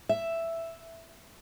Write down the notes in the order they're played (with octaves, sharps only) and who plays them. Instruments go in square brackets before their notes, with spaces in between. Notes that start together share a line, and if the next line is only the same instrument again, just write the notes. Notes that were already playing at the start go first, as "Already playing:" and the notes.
[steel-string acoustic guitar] E5